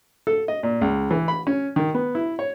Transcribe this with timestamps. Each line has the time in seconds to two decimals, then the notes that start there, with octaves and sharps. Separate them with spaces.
0.27 A4
0.48 D#5
0.63 A#2
0.81 C#2
1.11 E3
1.28 B5
1.47 C#4
1.76 D#3
1.94 B3
2.15 E4
2.39 C#5